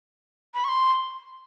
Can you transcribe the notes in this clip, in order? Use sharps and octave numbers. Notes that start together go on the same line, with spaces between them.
B5
C#6
C6